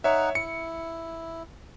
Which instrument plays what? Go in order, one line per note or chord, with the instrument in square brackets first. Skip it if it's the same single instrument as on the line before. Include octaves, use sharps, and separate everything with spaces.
[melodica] D#4 F#5 [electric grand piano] C#5 E5
[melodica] E4 [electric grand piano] C#7